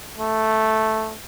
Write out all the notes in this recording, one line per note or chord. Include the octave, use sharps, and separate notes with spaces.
A3